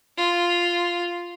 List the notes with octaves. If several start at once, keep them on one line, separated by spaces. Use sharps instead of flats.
F4